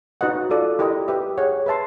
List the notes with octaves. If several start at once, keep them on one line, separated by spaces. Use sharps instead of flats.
D#4 F#4 B4 D#5 F#5
F4 A4 D5
E4 G4 A#4 D#5
G4 B4 E5
G#4 C#5 F#5
B4 E5 A5 C6